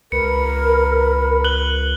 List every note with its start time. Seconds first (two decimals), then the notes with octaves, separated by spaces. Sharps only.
0.12 C#2 A#4 B4 C#7
1.44 F#6 F#7 G7